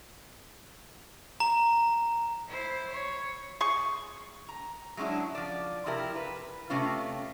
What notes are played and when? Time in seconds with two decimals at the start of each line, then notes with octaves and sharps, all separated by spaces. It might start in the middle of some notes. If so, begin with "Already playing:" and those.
1.40 A#5
2.48 E4 C5
2.91 C#5
3.61 G#4 C#6
4.49 A#5
4.97 F#3 G#3 C#4 D4 E4
5.35 F3 D5
5.86 C3 F3 E4 G4 A#4
6.16 B4
6.70 C3 A3 C#4 F4